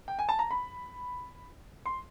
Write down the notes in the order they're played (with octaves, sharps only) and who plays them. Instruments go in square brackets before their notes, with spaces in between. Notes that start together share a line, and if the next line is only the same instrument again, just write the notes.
[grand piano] G5
G#5
A5
A#5
B5
C6